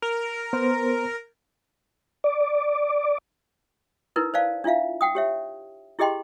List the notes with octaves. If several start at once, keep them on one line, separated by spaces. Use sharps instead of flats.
A#4
B3 C5
D5
D#4 E4 A#4 B4
C5 D5 F5 A5
D4 E4 F4 E5 F5
F#5 G5 D#6
G4 C#5 E5
E4 G4 G#4 D#5 G5 C6